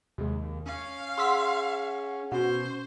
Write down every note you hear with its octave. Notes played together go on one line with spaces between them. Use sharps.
D#2 C3 G#3
C#4 F5
G#4 F#5 C6 E6 B6
B2 C#4 F#4 C5